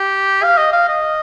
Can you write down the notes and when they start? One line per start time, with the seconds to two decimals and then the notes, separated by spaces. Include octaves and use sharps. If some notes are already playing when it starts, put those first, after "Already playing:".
Already playing: G4
0.43 F5
0.58 D#5
0.73 F5
0.88 D#5